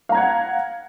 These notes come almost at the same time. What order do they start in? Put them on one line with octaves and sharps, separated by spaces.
F5 A#5 G#6 F#5